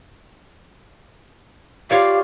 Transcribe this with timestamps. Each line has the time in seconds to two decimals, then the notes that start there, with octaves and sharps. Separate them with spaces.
1.91 F4 G4 C#5 D5 F5